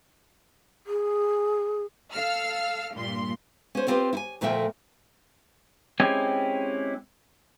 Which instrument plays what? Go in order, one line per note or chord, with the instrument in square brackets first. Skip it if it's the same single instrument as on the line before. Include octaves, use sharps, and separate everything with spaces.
[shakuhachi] G#4
[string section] A4 F5 E6 F6
G2 A#2 C6
[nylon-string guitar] C#4 C5
B3 C4 F4 G4 B4
E4 G#5
D2 A#2 F3 A3 E5 G5
[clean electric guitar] G#3 C4 C#4 E4 G4 G#5